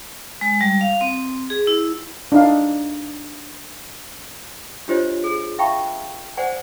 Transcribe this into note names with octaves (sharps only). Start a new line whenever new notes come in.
G#3
G3
F5
C4
G#4
E4
D4 D#4 F5
D4 F4 G4 C5 C#5 D#5
G#4
E5 F5 G5 A5 B5 C#6
C5 D5 F#5 G#5